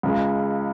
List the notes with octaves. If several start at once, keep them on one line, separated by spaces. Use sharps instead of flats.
C#2 C#3 G#3